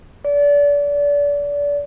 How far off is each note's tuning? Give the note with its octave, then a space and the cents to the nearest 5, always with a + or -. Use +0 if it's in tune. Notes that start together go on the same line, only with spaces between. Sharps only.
D5 -30